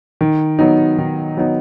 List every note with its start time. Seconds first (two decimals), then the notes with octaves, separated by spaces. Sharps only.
0.21 D#3
0.59 F#3 B3 D#4
0.98 D#3
1.37 F#3 B3 D#4